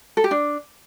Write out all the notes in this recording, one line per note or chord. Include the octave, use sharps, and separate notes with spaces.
A4
G4
D4